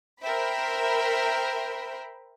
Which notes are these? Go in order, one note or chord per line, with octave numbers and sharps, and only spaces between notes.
A#4 C5 E5 G5 B5